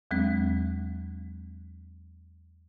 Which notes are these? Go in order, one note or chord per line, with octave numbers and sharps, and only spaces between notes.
E2 F#3 G#3 C4